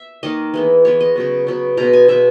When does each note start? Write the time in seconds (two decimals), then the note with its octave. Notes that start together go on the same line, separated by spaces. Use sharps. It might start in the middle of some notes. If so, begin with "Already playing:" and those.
Already playing: E5
0.23 D#3 A#3 D#5
0.54 E3 G#3 B3
0.85 E3 G#3 B3 C#5
1.01 D#5
1.16 C#3 F#3 B3
1.47 C#3 F#3 B3
1.77 B2 G#3 B3 A#5
1.93 G#5
2.08 B2 G#3 B3 E5